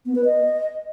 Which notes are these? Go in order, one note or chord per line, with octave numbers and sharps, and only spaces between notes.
B3
B4
D#5